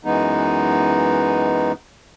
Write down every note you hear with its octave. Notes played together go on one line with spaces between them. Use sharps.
F#2 E3 G#3 B3 D#4